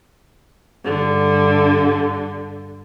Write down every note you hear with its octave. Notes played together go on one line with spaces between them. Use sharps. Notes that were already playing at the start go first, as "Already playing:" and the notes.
G2 D3